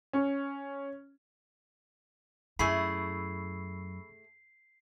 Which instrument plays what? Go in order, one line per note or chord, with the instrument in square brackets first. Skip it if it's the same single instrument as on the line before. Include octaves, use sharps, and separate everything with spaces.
[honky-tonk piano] C#4
[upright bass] F#2 [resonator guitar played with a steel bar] A3 E4 G#4 [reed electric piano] B5 C#6 E6 [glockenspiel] C7